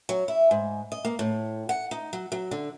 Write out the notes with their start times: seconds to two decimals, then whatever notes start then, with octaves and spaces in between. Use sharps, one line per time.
0.09 F#3
0.28 E4
0.51 G#2
0.92 D#5
1.05 A#3
1.19 A2
1.69 F#5
1.91 D#4
2.13 F#3
2.32 F#3
2.51 D3